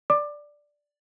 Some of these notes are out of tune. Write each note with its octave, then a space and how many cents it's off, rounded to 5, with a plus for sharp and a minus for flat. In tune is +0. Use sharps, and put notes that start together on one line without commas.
D5 +0 D6 +20